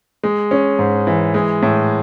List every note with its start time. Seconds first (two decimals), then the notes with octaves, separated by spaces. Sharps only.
0.23 G#3
0.51 C#4
0.79 G#2
1.07 E3
1.34 G#3
1.62 A2